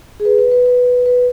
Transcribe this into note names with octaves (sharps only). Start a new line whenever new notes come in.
G#4
B4
B4
B4
B4
B4